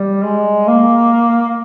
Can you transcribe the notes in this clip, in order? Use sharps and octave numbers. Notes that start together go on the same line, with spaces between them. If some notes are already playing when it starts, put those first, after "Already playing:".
Already playing: G3
G#3
A#3